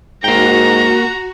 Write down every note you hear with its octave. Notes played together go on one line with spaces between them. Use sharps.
G#2 A#3 F#4 G5 A#5